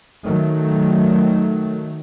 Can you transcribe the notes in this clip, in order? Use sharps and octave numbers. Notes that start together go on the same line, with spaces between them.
D#3 F#3 A3